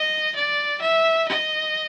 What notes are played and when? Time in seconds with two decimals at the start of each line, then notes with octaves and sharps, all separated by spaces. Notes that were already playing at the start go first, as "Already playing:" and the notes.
Already playing: D#5
0.36 D5
0.82 E5
1.29 D#5